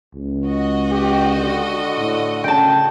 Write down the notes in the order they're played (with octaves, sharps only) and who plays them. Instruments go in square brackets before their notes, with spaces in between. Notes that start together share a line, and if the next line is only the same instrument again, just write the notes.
[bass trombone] C#2
[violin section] F#4 D#5
[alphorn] G4
D3
[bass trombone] A2
[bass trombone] C#3 [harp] G5 A5